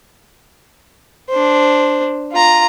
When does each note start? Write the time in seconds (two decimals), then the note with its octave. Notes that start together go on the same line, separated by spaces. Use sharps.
1.29 D4 C5
2.32 F4 A#5